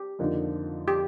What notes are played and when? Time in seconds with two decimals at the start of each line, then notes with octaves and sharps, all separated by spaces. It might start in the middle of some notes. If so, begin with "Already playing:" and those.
Already playing: G4
0.19 F2 D3 F3 A#3 D#4
0.88 G4